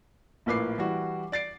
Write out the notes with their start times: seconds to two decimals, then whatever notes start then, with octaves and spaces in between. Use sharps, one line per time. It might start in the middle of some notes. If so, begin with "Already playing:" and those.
0.46 A#1 A2 A#3 B4 D6 C7
0.78 E3 G3 F#4
1.32 D5 A6 C7 D7